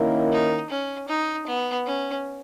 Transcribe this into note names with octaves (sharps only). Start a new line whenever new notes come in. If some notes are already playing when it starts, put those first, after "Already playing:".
Already playing: D#3 A#3 C#4 E4 A#4
D#4
C#4
D#4
B3
C#4